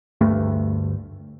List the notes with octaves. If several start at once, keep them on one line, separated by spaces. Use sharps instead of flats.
D2 G2 A3